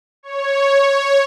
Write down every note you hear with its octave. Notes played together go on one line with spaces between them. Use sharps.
C#5